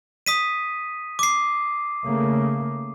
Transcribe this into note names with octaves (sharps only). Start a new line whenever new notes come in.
D#6 B6 D#7
D6 C7
C#3 A3 A#3